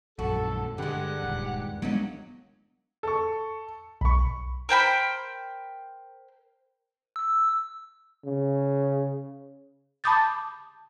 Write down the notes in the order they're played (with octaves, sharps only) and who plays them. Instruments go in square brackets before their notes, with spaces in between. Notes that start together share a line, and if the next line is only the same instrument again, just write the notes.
[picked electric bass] A#1 F#2 [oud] F#4 [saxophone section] A4
[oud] G2 G#3 [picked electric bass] D3 [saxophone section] G4 F#5
[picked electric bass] D#1
[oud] F#3 A#3 D#4 [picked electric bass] G#3 B3 D4
[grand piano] A4 C#6
[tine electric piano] B1 [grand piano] B5 C#6
[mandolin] A#4 C5 G5 B5
[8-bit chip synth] E6
[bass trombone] C#3
[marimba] A5 B5 D6 D#6 G6 A6